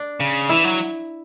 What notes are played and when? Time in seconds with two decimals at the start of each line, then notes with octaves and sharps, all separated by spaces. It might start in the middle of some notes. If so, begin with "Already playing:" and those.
Already playing: D4
0.20 C#3
0.49 E3 E4
0.64 F#3